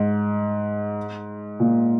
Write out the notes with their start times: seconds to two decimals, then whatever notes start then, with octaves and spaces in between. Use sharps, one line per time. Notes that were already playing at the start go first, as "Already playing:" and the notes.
Already playing: G#2
1.60 A#2